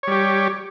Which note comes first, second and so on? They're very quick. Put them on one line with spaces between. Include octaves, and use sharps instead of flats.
C#5 G3 G4